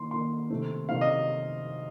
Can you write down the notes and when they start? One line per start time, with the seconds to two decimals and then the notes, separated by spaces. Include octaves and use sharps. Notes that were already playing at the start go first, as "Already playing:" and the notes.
Already playing: D#3 A#3 D#4 C6
0.11 D#3 A#3 D#4 C6
0.50 C3 D#3 A3 C4
0.89 C3 D#3 A3 C4 F5
1.01 D#5